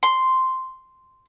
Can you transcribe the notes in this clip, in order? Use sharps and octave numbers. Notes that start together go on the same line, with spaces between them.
C6